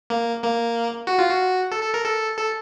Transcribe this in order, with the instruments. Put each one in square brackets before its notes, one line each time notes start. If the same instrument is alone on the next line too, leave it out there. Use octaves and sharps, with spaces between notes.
[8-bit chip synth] A#3
A#3
F#4
F4
F#4
A4
A4
A#4
A4
A4